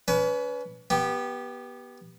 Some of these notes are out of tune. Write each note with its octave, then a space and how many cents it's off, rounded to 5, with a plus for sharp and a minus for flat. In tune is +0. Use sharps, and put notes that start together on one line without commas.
C#4 +35 B4 +0
B3 -20 G4 +0